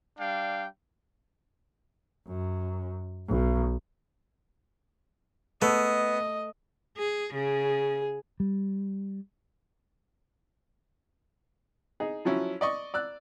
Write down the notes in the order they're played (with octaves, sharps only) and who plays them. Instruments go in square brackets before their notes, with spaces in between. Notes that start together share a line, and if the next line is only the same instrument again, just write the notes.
[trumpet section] G3 D4 F5 G5
[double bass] F#2
B1
[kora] A3 [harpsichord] B3 [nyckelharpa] D#5
[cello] G#4
[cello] C#3 [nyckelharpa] G#4
[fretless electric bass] G3
[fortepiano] D#4 G#4
F3 F#3 C#4 E4
D5 D#5 C#6
D5 E6 F#6